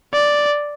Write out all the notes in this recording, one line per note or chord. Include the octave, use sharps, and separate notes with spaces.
D5